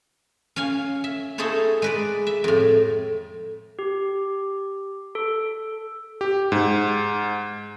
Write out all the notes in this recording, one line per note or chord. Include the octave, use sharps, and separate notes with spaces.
C#4 C#5 F5 G#5
E5
D#4 E4 G#4 A4 C5 C#5
G#3 B4 D5
E5
F2 A2
G4
A4
G4
G#2